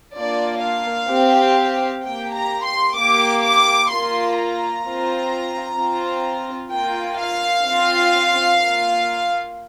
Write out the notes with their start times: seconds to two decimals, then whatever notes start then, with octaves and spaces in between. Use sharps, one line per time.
0.15 A#3 D4 F4 D5
0.62 F5
1.09 C4 G4
2.03 A#3 G4 G5
2.34 A#5
2.65 C6
2.97 A#3 G4 D6
3.44 D6
3.91 A#3 F4 C6
4.37 A#5
4.85 C4 F4
5.78 C4 F4
6.72 A#3 F4 G5
7.19 F5
7.66 C4 F4
8.59 A#3 F4